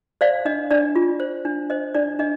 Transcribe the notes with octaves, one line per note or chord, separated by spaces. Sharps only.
C5 D5 F5
D4 D#5
D4 D5
F4
C5
D4
C5 D#5
D4 D5
D4 D#5